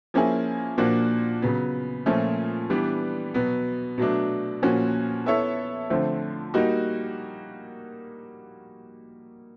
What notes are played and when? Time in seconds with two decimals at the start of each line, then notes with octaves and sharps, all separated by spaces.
0.14 F3 A#3 C#4 E4 G#4
0.78 A#2 F3 A#3 D4 F#4
1.42 C#3 F#3 B3
2.06 A#2 F3 A3 C#4
2.70 E3 G3 B3 D4
3.34 B2 F#3 B3
3.98 B2 F#3 A3 D4
4.62 A#2 F3 A#3 C#4 F#4
5.26 B3 E4 A4 C#5 E5
5.90 D3 F3 A3 C4
6.54 G3 A#3 D#4 F#4